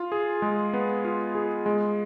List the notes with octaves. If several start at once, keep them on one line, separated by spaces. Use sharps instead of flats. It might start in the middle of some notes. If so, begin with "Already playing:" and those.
Already playing: F4
G#4
G#3
B3
F4
G#4
G#3